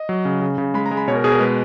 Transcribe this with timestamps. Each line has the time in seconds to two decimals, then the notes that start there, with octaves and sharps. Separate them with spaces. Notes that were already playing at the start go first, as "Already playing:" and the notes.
Already playing: D#5
0.09 F#3
0.25 C#3
0.42 C#3
0.58 C#3
0.74 G#3 B5
0.86 A#5
0.91 G#3
0.97 B5
1.08 B2 C#5
1.15 A#4
1.24 B2 G#4
1.32 A#4
1.40 G#3 B4